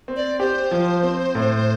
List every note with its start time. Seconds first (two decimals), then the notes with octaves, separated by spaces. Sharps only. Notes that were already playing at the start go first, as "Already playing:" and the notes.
0.08 C4
0.16 D5
0.40 G4 C5
0.71 F3
1.03 C4
1.35 A2